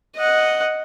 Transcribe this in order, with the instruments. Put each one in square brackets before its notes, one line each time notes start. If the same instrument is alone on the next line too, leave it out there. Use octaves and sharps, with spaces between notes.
[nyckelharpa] D#5 F#5